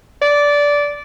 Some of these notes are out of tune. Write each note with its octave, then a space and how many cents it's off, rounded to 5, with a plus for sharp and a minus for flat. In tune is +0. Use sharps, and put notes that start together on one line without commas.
D5 -15